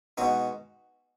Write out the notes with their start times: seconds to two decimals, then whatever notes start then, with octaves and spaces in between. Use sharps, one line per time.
0.17 B2 G#3 D#4 F#4